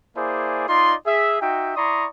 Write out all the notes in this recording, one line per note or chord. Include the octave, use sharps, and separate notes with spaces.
A#3 E4 G#4 C5 D5 G#5
D#4 F4 D5 D#5 C6
G#4 E5
D#4 F#4 E5 G5
E4 D5 A#5 C6 C#6 D#6